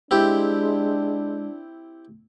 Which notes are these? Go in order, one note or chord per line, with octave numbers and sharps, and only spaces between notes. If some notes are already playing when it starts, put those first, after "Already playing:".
G#3 C4 D4 E4 G4